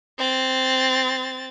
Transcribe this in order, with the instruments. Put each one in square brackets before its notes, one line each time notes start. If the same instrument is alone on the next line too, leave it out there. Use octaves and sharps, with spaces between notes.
[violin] C4 A6